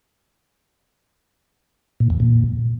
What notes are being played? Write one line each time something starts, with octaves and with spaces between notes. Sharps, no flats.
A#2
E2
A#2